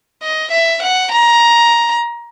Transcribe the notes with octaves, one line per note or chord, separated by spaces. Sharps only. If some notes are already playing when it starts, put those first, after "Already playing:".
D#5
E5
F#5
A#5